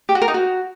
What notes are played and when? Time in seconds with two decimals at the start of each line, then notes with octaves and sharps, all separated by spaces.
0.09 G4
0.15 F#4
0.22 A#4
0.28 D#4
0.34 F#4